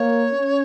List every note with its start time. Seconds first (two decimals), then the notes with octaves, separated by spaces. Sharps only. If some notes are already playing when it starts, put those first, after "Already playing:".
Already playing: A#3 C#5
0.31 C#4